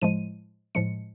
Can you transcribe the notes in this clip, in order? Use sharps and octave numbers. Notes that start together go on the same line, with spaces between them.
A2 F3 G#3 D#7
A2 F3 G#3 C#7